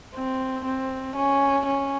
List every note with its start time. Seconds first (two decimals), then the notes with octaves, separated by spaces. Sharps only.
0.15 C4
0.65 C4
1.16 C#4
1.66 C#4